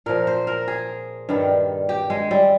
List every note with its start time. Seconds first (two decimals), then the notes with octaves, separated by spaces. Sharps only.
0.06 A#2 F3 A#4
0.27 C5
0.47 A#4
0.68 G#4
1.29 G2 D#3 G3
1.89 G4
2.10 G#3
2.31 G3